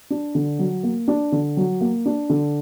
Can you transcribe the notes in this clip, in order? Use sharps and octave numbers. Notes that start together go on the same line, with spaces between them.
D4
D3
F#3
A#3
D4
D3
F#3
A#3
D4
D3